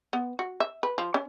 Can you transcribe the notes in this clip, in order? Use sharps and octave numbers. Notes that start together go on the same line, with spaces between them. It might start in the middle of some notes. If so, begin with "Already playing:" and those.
B3
F#4
E5
B4
F3
C#4